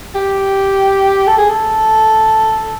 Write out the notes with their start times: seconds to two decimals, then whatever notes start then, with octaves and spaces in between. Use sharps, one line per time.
0.15 G4
1.27 A4
1.38 G#4
1.49 A4